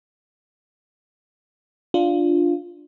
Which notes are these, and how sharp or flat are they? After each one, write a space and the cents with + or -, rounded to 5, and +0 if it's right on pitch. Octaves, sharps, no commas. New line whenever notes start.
D4 +0 F4 +0